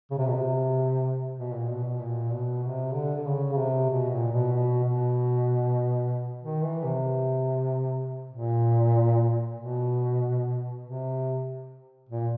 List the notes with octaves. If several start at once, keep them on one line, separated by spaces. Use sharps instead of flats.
C#3
C3
B2
C3
B2
A#2
B2
B2
A#2
B2
C3
D3
D3
C#3
C#3
C3
B2
A#2
B2
B2
B2
D#3
E3
C3
A#2
B2
C3
A#2